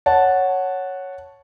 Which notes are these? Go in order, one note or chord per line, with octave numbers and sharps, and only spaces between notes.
C#5 F#5 A5